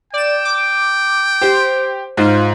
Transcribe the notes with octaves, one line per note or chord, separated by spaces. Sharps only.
D5 G5 E7
D6
G4 C5
G#2 F4 C5